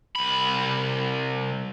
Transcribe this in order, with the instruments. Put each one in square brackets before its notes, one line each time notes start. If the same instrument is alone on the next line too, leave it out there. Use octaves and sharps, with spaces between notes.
[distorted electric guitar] C2 B5